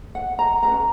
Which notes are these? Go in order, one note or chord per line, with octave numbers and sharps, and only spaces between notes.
F#5
A#5
G#4 B4 A#5
C#4